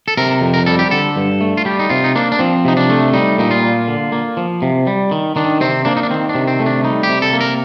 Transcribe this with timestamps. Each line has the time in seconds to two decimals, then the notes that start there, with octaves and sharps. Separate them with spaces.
0.08 A4
0.17 C3 A#4
0.41 F2
0.54 A#4
0.66 G3 A4
0.79 G4
0.91 D3 A4
1.16 G2
1.41 A3
1.57 F4
1.65 G3 G4
1.79 D#4
1.90 C3 F4
2.04 D#4
2.15 A#3 D4
2.32 D4
2.39 F3 C4
2.65 C3 D#4
2.77 D4
2.90 A3
3.13 G3 D#4
3.38 A#2 D#4
3.51 F4
3.63 A#3
3.88 D3
4.12 A#3
4.37 F3
4.62 C3
4.87 G3
5.11 D#3
5.36 D#3 D4
5.61 C3 C4
5.85 A#3 D4
5.97 D#4
6.03 D4
6.10 D#3 C4
6.29 D4
6.35 C3
6.47 C4
6.60 A3
6.66 D4
6.84 G3 D#4
7.03 G4
7.09 C3
7.22 A4
7.33 A#3
7.41 A#4